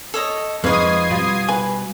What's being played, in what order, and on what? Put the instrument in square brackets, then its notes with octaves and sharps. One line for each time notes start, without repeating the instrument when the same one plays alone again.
[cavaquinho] A4 C#5 D#5
[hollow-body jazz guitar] F2 [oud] G#3 D#4 [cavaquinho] B4 C#6 [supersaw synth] D#6 G#6 C7
[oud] B2 G3 F4
[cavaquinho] B4 [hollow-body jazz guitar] G#5